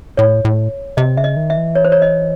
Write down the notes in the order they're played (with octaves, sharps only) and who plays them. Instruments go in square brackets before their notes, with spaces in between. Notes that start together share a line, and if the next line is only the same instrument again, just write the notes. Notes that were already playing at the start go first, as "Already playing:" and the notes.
[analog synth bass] A2 [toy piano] C#5
[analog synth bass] A2
[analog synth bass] C3 [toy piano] D#5
[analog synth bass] C#3 [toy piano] E5
[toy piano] D#5
[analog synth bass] D#3
[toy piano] E5
[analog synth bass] E3
[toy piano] C#5
C5
C#5
D#5